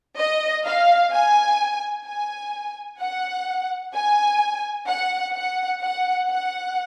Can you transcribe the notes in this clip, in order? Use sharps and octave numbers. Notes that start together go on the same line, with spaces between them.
D#5
F5
G#5
G#5
F#5
G#5
F#5
F#5
F#5
F#5